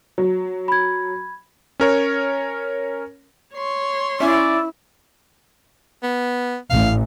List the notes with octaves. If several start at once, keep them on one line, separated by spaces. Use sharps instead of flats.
F#3
B5 G#6
C#4 A#4 C#5
C#5 C6
C#4 E4 D5 E5 G#5
B3
A1 F5